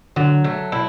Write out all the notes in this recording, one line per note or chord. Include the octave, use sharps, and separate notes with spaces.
D3 F#3
A3
E4